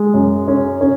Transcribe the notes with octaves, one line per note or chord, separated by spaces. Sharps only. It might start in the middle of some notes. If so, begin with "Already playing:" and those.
Already playing: G#3
F#2
C#4
C#4